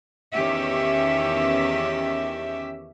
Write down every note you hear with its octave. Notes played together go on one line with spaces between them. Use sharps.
E2 D#3 C#4 G4 E5